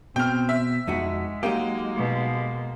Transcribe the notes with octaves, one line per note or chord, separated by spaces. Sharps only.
B2 C4 G5 F6
E5
F2 G#3 D#4 F#4
F#3 A#3 D#4 G4
B2